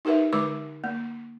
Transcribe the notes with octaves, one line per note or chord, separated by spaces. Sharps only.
D#4 G4 A#4 B4 E5
D3 G#3 B4 D6
A#3